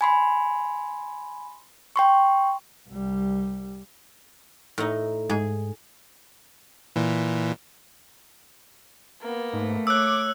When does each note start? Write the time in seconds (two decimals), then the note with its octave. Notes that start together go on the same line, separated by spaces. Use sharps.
0.01 G#5 B5 C6
1.96 G5 C6 C#6
2.89 C2 G3
4.78 A2 D#4
5.30 G#2 G#4
6.96 A#2 E3
9.21 A#3 B3
9.53 G#2 A3
9.87 C#5 D6 E6 F#6